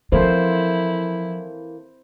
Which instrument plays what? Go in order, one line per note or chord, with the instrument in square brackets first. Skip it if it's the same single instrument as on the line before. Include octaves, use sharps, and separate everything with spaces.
[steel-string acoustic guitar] E3 A#3 A4 [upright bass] F3 [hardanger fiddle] E4 [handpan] C5